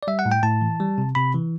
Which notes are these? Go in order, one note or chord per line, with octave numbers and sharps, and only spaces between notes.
D5
G3 E5
F#5
A2
G5
A2 A5
E3
G3
C3
C3 B5
E3